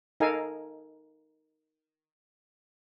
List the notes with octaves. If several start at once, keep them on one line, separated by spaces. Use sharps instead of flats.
D#4 A4 A#4 D#5 F5 G#5